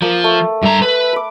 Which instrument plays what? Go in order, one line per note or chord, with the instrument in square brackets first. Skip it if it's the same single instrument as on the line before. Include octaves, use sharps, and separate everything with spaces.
[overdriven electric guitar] F3 [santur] A#3
[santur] A3
[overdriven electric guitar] G2 A#5 [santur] E5
[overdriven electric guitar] B4
[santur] B4 D6